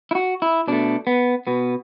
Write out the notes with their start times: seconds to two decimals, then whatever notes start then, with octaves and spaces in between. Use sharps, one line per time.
0.11 E4
0.15 F#4
0.42 E4
0.68 B2 A3 D4
1.07 B3
1.47 B2 B3